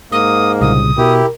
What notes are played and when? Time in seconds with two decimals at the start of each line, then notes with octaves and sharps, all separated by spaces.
0.12 G#2 A#3 D#6
0.61 C2 A#2 C#3 D#6
0.98 B2 E4 G4 A#4